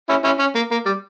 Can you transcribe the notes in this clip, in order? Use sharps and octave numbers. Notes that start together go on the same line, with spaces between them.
C#4 E4
C#4 E4
C#4
A#3
A#3
G3